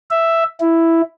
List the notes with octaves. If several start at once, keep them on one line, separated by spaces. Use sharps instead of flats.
E5
E4